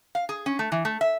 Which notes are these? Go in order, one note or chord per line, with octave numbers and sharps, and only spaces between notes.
F5
G#4
C#4
A3
E3
A3
E5